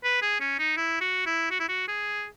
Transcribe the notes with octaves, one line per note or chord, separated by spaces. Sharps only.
B4
G#4
C#4
D#4
E4
F#4
E4
F#4
E4
F#4
G#4